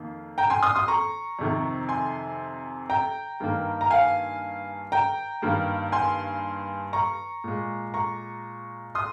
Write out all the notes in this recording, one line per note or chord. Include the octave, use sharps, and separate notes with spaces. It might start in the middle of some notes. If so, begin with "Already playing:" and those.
Already playing: F2 D#3 A#3
G5 A#5
G#5 C6
C6 D#6
C6 D#6
A#5 C#6
F2 C3 D#3
G#5 C6
G5 A#5
G2 D#3 A#3
A#5
F5 G#5
G5 A#5
G2 D#3 A#3
G#5 C6
A#5 C#6
A#2 G#3
A#5 C#6
C6 D#6